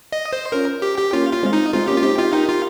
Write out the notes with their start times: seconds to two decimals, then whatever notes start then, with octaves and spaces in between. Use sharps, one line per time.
0.12 D#5
0.33 C5
0.52 C#4 F4 A#4
0.82 G4
0.98 G4
1.12 A#3 C#4 F4
1.33 F4
1.43 G#3 C4
1.53 D#4
1.73 G#3 C4 F4
1.88 A#3 C#4 G4
1.97 F4
2.03 C4 D#4 G4
2.18 D#4 F4 G4
2.33 D#4 G4 A#4
2.49 F4